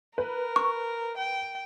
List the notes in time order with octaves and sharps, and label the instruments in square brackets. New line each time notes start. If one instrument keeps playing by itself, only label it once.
[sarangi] A#4 [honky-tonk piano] B4
[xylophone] C#6
[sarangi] G5